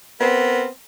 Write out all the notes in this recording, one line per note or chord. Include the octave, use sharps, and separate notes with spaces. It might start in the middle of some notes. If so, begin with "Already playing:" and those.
B3 C4 A#4